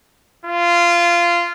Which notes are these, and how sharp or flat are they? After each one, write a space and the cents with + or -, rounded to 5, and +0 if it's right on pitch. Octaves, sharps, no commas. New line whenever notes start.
F4 -15